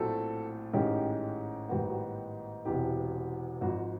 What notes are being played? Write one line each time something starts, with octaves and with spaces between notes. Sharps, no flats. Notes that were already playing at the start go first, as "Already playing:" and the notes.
Already playing: A#1 A2 F#3 A3 C4 A4
A1 G#2 D#3 G#3 C#4 G4
A1 G#2 D#3 G3 B3 F#4
F#4
E1 E2 C3 E3 G4
G#1 G#2 F3 F#4